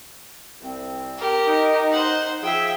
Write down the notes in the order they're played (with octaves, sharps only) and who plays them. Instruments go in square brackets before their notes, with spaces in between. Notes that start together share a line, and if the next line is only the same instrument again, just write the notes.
[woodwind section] C2 C4
[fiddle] G4 A#4
[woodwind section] D#4
[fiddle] C5 F#5
[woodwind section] F3 G#4 [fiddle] E5 G5